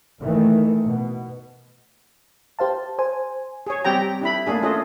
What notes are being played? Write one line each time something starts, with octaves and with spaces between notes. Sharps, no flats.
A#2 D#3 E3 A3
B2
G4 C5 F5 A5
C5 G#5
G#4 C#5
G3 C4 G4 G5 A#5
D4 E4 B5
A3 A#3 D4 G#4
C#4 F4 A4 D#5